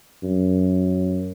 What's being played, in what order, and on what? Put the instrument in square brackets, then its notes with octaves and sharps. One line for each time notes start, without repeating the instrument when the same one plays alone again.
[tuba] F#2